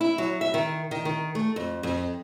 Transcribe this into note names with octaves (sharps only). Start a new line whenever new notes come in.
E4
F#3
E5
D#3
D#3
D#3
A3
F2
F2